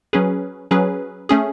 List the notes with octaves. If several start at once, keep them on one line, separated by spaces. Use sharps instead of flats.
F#3 C#4 G#4 B4
F#3 C#4 G#4 B4
A3 C#4 G#4